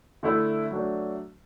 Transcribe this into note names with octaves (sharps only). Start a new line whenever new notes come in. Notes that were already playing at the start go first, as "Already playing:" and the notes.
D3 A3 E4
F#3 A3 D4